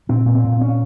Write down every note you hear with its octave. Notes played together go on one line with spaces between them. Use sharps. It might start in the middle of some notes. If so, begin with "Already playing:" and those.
A#2 C4
A#2
C4
A#2
C#4